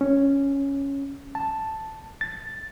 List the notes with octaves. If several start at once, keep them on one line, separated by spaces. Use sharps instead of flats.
C#4
A5
A6